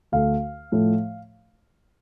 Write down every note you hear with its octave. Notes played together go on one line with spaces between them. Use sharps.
D2 D3 A3 F5
A2 F3 A3